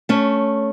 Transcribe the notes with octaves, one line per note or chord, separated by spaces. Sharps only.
A3 C#4